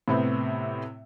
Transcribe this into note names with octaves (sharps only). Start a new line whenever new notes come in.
A2 C3 B3 C4